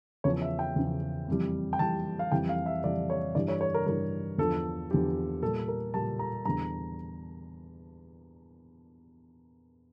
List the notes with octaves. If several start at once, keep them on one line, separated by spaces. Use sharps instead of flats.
E2 C#3 F3 C#5
E5
G5
E2 C#3 F3
F2 E3 G3
G5
F2 E3 G3 A5
F5
F2 E3 G3 G5
F5
E5
F2 E3 G3 D5
C#5
G2 E3 G3 D5
C#5
C#5
A#4
G2 E3 G3 A#4
E2 D3 F3 A4
E2 D3 F3 G4
A#2 G3 A4
A#4
A#2 G3 A5
A#5
E2 D3 G3 A#5